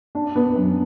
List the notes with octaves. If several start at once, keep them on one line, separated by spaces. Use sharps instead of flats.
D4
B3
F#2